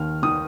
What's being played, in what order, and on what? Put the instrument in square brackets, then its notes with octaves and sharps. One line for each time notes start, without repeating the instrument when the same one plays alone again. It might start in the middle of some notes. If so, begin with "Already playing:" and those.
Already playing: [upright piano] D#2 D#3 F6
D#3 D#6